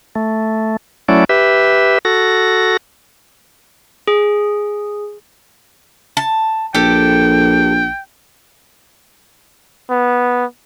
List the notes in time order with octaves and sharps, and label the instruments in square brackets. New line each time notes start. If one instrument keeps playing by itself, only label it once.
[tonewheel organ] A3
F#3 A3 C#4 E4 D5
G4 B4 E5
F#4 A4 A#6
[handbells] G#4
[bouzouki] A5
[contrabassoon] A#1 [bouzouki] G4 A4 [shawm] G5
[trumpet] B3